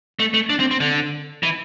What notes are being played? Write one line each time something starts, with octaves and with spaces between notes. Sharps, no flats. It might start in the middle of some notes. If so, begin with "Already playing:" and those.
A3
A3
D4
C4
C4
D3
E3